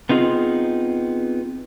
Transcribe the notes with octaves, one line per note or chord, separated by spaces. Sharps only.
B3 C4 D#4 F4 G#4